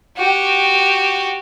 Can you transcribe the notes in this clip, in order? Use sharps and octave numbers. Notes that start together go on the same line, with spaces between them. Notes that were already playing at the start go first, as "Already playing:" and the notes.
F#4 G4